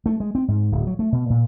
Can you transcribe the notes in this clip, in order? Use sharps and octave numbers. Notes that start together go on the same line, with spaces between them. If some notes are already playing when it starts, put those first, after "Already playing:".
A3
G#3
C4
G#2
D1
F#3
A3
B2
A#2